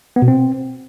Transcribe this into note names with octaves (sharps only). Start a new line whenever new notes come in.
B3
B2
C4